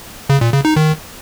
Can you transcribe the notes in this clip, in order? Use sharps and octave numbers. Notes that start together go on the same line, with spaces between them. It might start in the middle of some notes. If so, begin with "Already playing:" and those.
C#3
A#2
C#3
D#4
D#3